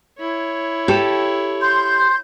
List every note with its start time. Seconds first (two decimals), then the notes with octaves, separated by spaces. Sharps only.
0.19 E4 C#5
0.88 G4 A4
1.61 C6 G6